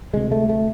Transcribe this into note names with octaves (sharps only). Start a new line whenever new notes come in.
D2 C3 G#3
A3
A3